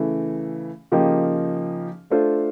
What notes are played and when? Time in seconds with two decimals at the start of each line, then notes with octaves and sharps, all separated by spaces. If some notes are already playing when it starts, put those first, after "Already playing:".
Already playing: C#3 E3 A3
0.92 C#3 F3 A#3 D#4 G4
2.10 A3 D4 F4 A4 C5